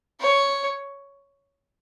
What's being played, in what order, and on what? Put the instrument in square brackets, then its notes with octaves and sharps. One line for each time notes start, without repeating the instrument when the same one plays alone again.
[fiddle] C#5